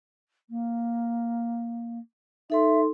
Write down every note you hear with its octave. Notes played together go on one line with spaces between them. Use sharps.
A#3
D#4 A4 E5 C6